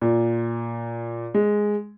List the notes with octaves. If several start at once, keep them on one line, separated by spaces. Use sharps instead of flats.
A#2
G#3